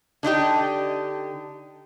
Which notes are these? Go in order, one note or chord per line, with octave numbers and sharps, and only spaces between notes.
D3 D4 D#4 G4